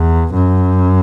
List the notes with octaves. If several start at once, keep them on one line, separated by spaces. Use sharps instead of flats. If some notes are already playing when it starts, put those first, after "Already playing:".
Already playing: E2
F#2